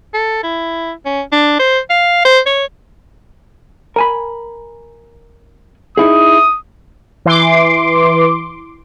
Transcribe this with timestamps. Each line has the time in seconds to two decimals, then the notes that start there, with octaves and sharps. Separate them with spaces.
0.14 A4
0.43 E4
1.05 C#4
1.32 D4
1.59 C5
1.90 F5
2.25 C5
2.46 C#5
3.96 A#4 G#5 B5
5.97 D#4 E4 G#4 D#6
7.25 E3 C6 D6